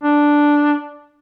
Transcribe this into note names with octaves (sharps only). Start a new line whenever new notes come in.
D4